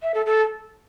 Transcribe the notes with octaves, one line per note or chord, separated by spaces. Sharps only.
E5
A4
A4